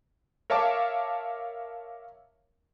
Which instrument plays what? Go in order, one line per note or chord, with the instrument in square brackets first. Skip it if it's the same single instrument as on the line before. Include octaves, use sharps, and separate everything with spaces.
[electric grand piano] A#4 C#5 E5 F5 A5 D6